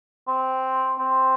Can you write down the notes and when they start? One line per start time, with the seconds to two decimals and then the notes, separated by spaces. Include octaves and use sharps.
0.28 C4
0.99 C4